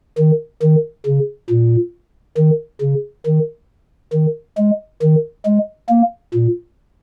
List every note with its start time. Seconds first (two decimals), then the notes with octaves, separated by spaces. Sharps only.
0.18 D#3
0.62 D#3
1.06 C#3
1.49 A#2
2.37 D#3
2.81 C#3
3.26 D#3
4.13 D#3
4.58 G#3
5.02 D#3
5.46 G#3
5.89 A#3
6.34 A#2